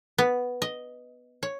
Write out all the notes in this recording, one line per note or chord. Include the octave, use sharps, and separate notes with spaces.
B3
D#5
C#5